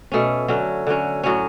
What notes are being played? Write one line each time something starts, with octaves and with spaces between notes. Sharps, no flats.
B2 A3 C#4
D3 F#3 C#4
D3 F#3 C#4
A2 F#3 C#4